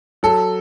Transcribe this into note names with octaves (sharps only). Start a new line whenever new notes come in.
F#3 A4